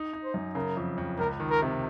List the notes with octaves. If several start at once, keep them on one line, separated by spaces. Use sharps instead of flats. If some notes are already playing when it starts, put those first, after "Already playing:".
Already playing: D#4
D#4
C5
F#2
C#3 A#4
F2
F2
C#2 A#4
D#3
A#4
C3